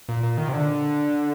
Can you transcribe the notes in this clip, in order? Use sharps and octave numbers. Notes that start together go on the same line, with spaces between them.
A#2
A#2
D#3
C3
D3